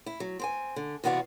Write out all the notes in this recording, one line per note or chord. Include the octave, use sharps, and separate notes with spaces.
E4
F#3
C4 C5 G#5
D3
E2 C3 B3 F#4 D5 F5